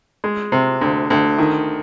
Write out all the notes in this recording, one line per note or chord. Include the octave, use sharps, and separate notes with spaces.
G#3
C3
D2
D2
D#3